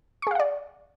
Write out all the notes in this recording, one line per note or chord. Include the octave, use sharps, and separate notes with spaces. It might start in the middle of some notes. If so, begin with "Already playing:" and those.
G#4 D5 F5 F#5 C#6